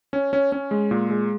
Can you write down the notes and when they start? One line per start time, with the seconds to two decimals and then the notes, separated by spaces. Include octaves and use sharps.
0.13 C#4
0.33 C#4
0.52 C#4
0.71 G#3
0.91 A#2
1.10 G#3